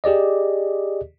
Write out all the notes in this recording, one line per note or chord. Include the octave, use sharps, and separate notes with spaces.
G4 G#4 D5 D#5